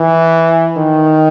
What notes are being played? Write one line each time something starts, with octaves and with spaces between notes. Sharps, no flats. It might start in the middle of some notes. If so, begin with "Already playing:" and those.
Already playing: E3
D#3